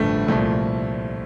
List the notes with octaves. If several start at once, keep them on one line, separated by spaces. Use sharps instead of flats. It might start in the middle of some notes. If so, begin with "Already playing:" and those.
Already playing: A1 G2 D3 F3 G3 A3
C2 A#2 F3 A3